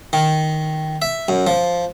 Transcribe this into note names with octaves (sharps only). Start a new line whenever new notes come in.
D#3
E5
F#2
F3